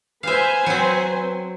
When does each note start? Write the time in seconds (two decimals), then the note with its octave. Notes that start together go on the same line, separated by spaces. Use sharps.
0.23 B4 C5 E5 F5 G#5
0.66 F#3 C4